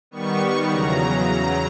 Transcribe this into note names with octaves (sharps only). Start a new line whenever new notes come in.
D#3 G3 B3 C#6
E2 C#3 F#3 A#5